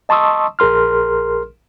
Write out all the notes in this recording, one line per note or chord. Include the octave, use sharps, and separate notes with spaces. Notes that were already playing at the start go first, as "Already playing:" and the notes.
D#5 A5 C6 C#6 D#6 E6
A#1 G#4 A#4 C6 F6